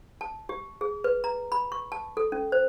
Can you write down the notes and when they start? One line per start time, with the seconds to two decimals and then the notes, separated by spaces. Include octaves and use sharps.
0.21 A5
0.49 G4
0.81 G#4
1.04 B4
1.24 A#5
1.52 B5
1.72 C#6
1.92 A5
2.17 A4
2.32 C#4
2.52 C5